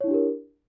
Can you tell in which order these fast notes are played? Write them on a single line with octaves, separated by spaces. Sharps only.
C#5 E4 D4 G4 A#4